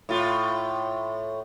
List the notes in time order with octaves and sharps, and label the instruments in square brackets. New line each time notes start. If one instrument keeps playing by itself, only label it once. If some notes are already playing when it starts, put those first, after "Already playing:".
[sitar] A2 F4